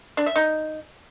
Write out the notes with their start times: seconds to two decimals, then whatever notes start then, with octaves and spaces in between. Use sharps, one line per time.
0.17 D4
0.26 E5
0.36 D#4